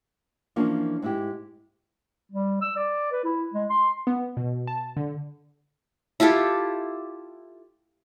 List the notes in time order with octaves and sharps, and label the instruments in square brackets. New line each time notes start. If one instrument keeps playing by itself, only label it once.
[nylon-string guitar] E3 F3 A#3 C#4 D4 F4
G#2 E4 G4
[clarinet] G3
E6
D5
B4
E4
G#3
C6
[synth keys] B3
B2
A5
D3
[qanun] E4 F4 G4 A4